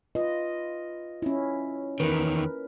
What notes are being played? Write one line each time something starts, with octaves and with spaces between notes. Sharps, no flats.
F4 B4 D#5
C#4 E4
E2 D#3 A#4 B4